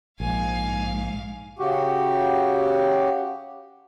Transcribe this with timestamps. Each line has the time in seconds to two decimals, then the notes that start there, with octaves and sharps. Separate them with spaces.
0.20 A#1 G#2 F5 G#5
1.59 C#3 F#4 G4